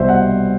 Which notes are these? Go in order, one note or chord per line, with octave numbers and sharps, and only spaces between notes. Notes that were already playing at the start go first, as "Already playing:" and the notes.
Already playing: C2 B2 C5 E5
F#5